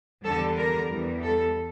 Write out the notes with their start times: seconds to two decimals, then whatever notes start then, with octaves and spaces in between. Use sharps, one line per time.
0.24 E2 D3 G3 A4
0.57 A#4
0.90 E2 E3 G3
1.22 A4